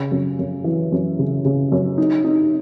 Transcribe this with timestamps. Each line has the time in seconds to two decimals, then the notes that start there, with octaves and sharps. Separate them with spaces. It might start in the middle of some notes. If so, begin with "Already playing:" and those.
Already playing: C#3
0.12 F#2
0.39 F#2
0.64 E3
0.92 F#2
1.19 C#3
1.45 C#3
1.72 F#2
1.98 D#4
2.25 D#4